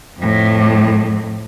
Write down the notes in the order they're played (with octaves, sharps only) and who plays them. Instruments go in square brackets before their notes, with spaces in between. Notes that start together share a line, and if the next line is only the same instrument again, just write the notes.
[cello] F2 A2